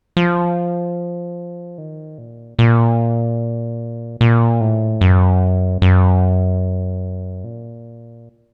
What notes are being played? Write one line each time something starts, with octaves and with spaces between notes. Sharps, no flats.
F3
D#3
A#2
A#2
A#2
A2
F#2
F#2
A#2